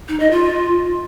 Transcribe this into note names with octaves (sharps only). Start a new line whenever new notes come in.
D#4
D#5
F4